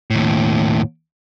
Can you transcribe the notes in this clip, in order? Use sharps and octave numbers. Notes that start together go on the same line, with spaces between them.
D#2 A2